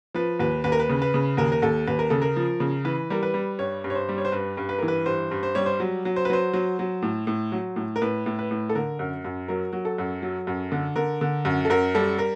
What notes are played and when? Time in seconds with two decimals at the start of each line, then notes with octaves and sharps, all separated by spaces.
0.14 F3 B4
0.39 D#2 B4
0.64 D#2 B4
0.72 A#4
0.80 B4
0.89 C#3
1.02 B4
1.14 C#3
1.37 D#2 A#4
1.52 A#4
1.62 D#2 A4
1.87 D#2 B4
1.99 A#4
2.10 C#3 A4
2.22 A#4
2.36 F3
2.60 C#3
2.85 E3 B4
3.10 G3 A#4
3.23 B4
3.34 G3
3.59 G2 C#5
3.84 G2
3.90 C#5
3.95 C5
4.09 G3
4.18 C#5
4.25 C5
4.32 G2 B4
4.57 G2
4.69 B4
4.79 E3 A#4
4.88 B4
5.06 G2 C5
5.31 G2
5.43 C5
5.55 G3 C#5
5.66 C5
5.80 F#3
6.05 F#3
6.16 C5
6.25 B4
6.30 F#3 C5
6.53 F#3
6.79 F#3
7.02 A2
7.27 A2
7.52 F#3
7.76 A2
7.96 A#4
8.02 A2 B4
8.26 A2
8.39 B4
8.51 A2
8.70 A4
8.75 D3 A#4
8.99 F#2
9.24 F#2
9.48 F#3 A#4
9.73 F#3
9.85 A4
9.98 F#2
10.22 F#3
10.47 F#2
10.72 D3
10.96 D3 A#4
11.21 D3
11.45 F#2
11.65 A4
11.70 F#2 A#4
11.95 G3 A4
12.19 A#4